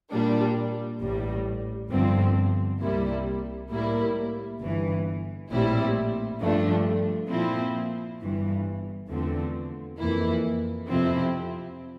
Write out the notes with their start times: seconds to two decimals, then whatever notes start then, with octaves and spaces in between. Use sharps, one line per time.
0.11 A#2 G3 D4
1.00 A1 A2 G3
1.90 G1 G2 D3 F3 C4
2.80 C2 C3 G3 A#3 E4
3.70 A2 G3 A#3 E4
4.60 G1 G2 E3
5.50 A#1 A2 G3 C4 E4
6.40 G2 F3 A3 D4
7.29 A#2 F3 C4 E4
8.19 G1 G2 E3
9.09 E2 D3 F3 A3 C4
9.99 F2 E3 A#3 E4
10.88 F2 C3 F3 C4 E4